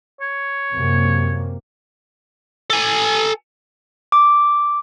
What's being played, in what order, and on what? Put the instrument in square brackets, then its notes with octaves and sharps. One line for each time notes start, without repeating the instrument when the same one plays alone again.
[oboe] C#5
[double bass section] F#2 C3 A#3
[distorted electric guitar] A4 G#5
[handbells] D6